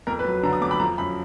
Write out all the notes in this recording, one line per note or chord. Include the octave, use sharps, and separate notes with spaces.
F2 A#4
B4
F#3
D3 A#5
D#6
F2 D6
B5
F3 A#5
F#2 B5